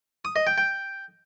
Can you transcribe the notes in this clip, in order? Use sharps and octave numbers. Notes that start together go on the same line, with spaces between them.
D#6
D#5
G5
G5